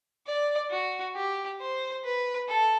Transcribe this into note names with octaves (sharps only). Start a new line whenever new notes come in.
D5
F#4
G4
C5
B4
A4